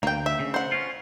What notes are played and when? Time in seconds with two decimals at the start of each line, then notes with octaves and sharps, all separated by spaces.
0.03 D2 A#3 G5
0.26 E5
0.40 C#3
0.54 C5 F#5
0.72 C#4 F4